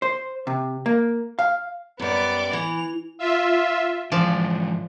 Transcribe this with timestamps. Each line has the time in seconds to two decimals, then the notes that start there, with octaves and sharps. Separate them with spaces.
0.02 C5
0.47 C3
0.86 A#3
1.39 F5
2.00 F#2 G3 B3 D5
2.53 E3 F7
3.19 F4 E5
4.12 G#2 E3 F3 D5